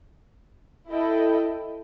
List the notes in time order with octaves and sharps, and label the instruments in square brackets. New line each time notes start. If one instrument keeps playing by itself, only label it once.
[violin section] E4 A4 D#5 G5